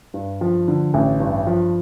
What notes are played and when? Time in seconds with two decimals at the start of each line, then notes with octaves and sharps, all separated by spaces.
0.14 G2
0.41 F3
0.68 D3
0.94 A1
1.20 G2
1.47 F3